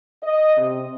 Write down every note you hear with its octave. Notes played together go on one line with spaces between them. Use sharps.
D#5
C3